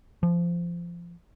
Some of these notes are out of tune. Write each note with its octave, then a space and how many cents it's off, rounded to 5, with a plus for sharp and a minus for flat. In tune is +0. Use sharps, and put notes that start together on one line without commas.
F3 -20